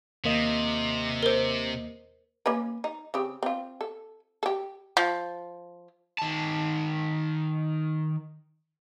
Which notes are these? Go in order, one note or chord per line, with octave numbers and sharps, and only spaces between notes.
D#2 C3 A#3 D#5
A#4 C5
A#3 C#4 B4
D#4
C#3 C4 G4
C4 F4
A4
G4 A4
F3
D#3 A5